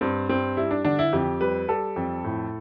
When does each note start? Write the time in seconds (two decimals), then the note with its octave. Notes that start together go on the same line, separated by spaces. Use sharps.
0.01 G2 C4
0.29 G2 C4
0.57 G3 E4
0.71 D4
0.85 D3 D4
0.99 E4
1.13 F2 G4
1.41 G3 B4
1.68 G3 A4
1.96 F2
2.24 A2